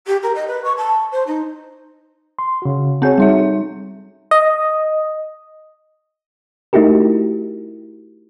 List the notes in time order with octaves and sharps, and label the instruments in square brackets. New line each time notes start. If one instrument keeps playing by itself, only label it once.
[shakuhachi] G4
A#4
D#5
B4
C#6
A5
C5
D#4
[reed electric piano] C6
C#3 F#4
[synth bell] C4 G6 [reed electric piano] F#4 G#4 C#5
[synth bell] G3 D#4 E5
[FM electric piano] D#5
[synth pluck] A3 D#4 E4 F#4 G4 A#4